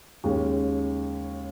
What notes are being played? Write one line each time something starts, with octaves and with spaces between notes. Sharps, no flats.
D#2 C#3 G#3 C#4